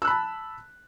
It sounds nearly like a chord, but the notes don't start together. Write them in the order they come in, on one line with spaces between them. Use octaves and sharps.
E6 F#6 B5 A5